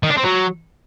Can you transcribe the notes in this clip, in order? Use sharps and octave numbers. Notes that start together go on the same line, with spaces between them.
D#3
D4
C4
F#3